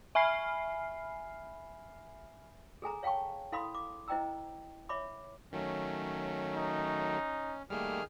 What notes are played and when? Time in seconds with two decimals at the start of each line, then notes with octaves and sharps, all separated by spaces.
0.15 E5 G#5 B5 F6 C7
2.82 G#4 A4 G#5 A#5
3.03 C#5 F5 G5 A5 C#6
3.52 E4 A4 F5 B5 C6 D#6
3.75 D6
4.08 E4 C5 D#5 G5 A#5 E6
4.89 C#5 E5 B5 D6
5.53 D#3 F#3 A3 C#4
6.54 D#4
7.70 D#3 G3 A3 A#3 G#4 F6